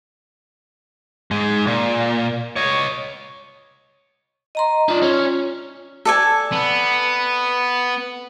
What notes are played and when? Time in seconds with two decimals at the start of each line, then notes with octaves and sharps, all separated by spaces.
1.31 G#2 G#3
1.67 A#2
2.56 C#5 D#5
4.55 D#5 A#5 C6
4.89 D#4 F4 D5
5.03 C#4
6.05 A4 D5 G#5
6.52 B3